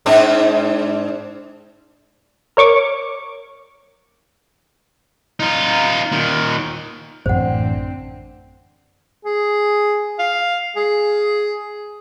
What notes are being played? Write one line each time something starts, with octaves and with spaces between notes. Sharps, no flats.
G#2 C4 D4
A#4 C#5 C#6 D6
D#4 F4
A#2 D#3
A1 F#2 D3 C4 C5 F#5
G#4
F5
G#4